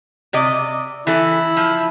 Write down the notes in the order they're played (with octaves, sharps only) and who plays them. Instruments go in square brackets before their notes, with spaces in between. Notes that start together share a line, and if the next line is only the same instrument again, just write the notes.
[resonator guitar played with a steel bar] C3 D5 D#5
[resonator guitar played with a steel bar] E3 A4 [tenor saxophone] E4
[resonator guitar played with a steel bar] F3